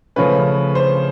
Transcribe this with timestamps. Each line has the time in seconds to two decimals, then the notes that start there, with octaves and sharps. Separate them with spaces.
0.16 C#3 F3 A3 C#4 B4
0.75 C5